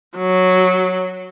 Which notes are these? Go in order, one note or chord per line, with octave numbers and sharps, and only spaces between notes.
F#3